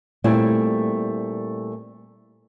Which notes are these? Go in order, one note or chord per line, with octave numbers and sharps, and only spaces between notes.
A#2 G3 A3 C4 E4 G#5